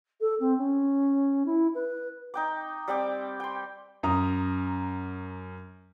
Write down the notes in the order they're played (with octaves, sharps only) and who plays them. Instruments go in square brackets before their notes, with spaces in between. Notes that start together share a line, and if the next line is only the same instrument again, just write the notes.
[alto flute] A4
C4
C#4
E4
B4
[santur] D#4 G5 D6
G3 C4 G5 D6
G5 C6
[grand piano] F#2 A#5 D#6